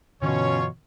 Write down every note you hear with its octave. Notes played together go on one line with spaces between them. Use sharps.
G2 B2 D3 E3 C#4 F4 C#5